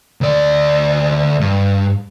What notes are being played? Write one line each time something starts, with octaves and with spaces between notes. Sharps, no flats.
D2 D5
G2